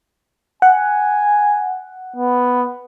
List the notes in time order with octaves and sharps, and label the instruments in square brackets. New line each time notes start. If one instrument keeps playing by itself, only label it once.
[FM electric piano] F#5 [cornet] G#5
[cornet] B3